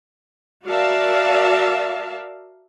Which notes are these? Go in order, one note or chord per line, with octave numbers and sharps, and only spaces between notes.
F#4 A#4 D5 E5 F5 A5